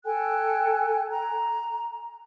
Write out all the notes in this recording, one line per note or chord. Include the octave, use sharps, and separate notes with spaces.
A4 G5 G#5 F#6
A#5